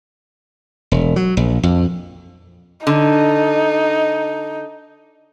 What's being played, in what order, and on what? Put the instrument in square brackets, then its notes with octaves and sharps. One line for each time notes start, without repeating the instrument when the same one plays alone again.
[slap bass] E1
F#3
A#1
F2
[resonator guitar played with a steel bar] D3 [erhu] D#4